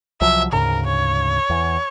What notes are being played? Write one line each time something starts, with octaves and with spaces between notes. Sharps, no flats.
C2 F3 F#3 E5
D2 G#2 C#3 A#4
C#5
E2